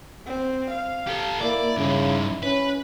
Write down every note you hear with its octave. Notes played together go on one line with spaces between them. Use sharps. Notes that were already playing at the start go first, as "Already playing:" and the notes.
C4
F5
G4 A4
A#3 E4 D5
G2 C#3 D#4
C#4 B4